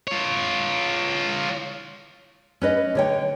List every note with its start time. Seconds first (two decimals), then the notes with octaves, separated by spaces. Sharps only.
0.08 F4 C#5
2.62 C#4 B4 D#5
2.95 D3 C#5 G5